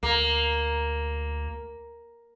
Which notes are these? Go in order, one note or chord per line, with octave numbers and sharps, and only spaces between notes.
D2 A#3